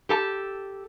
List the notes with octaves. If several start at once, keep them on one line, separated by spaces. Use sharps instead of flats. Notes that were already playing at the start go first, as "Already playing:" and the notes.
G4 A4 A5